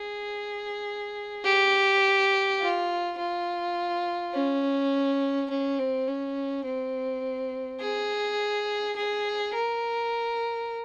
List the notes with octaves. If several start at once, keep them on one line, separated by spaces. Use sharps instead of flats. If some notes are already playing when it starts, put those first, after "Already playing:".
Already playing: G#4
G4
F4
F4
C#4
C#4
C4
C#4
C4
G#4
G#4
A#4